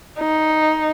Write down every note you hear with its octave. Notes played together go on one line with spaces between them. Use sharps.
D#4